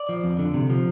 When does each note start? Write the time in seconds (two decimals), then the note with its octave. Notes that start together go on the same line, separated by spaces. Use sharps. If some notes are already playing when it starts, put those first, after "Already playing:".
Already playing: D5
0.09 F3
0.24 F2
0.39 D3
0.54 C3
0.69 F3